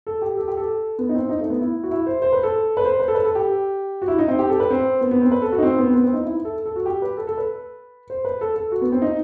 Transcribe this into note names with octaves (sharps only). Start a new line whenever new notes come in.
A4
G4
A4
G4
A4
B3
D#4
C4
D#4
A3
B3
E4
F#4
E4
C5
C5
B4
A4
B4
C5
B4
A4
B4
A4
G4
F#4
E4
D#4
C4
G4
A4
B4
C4
B3
B3
C4
B4
A4
F#4
D#4
C4
B3
C4
B3
C4
D#4
E4
A4
A4
F#4
G4
B4
A4
A4
B4
C5
B4
A4
A4
F#4
B3
C4
D#4